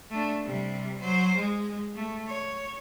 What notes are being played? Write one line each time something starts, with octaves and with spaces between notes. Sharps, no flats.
A3 D4
C3 G3
F#3 C5
G#3
A3
C#5